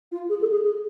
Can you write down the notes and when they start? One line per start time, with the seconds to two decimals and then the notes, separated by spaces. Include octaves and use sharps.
0.11 F4
0.29 G#4
0.41 A4
0.51 G#4
0.63 G#4